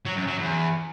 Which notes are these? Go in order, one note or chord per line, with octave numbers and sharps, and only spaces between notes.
F#3
F#2
F#3
E2